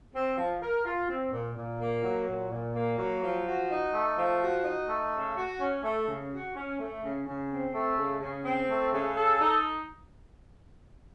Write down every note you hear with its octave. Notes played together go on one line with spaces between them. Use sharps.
C4
F3
A#4
F4
C4
A#2
A#2
A#3
F#3
A#2
A#2
A#3
F#3
F3
F#4
D#4
A3
F3
F#4
D#4
A3
C#3
F#4
C#4
A3
C#3
F#4
C#4
A3
C#3
C#3
C4
A3
C#3
C#3
C4
A3
C#3
A4
D#4